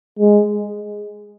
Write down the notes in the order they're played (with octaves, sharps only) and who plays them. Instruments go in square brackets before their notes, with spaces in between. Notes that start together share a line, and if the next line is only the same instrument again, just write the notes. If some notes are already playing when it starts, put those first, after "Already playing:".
[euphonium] G#3